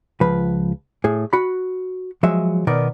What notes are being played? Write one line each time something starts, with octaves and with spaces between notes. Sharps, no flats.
C#2 F3 B4
A2 G#4
F#4 B5
F3 F#3 G#3 E5
B2 D#3 B3 A#4 D5